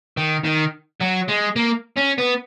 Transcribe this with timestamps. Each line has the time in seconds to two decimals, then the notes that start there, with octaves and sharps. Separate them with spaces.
0.17 D#3
0.45 D#3
1.00 F#3
1.28 G#3
1.56 A#3
1.98 C#4
2.18 B3